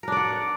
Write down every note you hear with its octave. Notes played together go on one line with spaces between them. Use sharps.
D4 A#4 D5 F#5